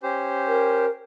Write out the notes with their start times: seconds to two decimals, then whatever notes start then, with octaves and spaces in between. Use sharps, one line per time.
0.03 C#4 G4 C5
0.48 A#4